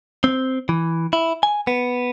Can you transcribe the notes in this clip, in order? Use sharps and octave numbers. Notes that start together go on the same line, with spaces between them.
C4
E3
E4
G#5
B3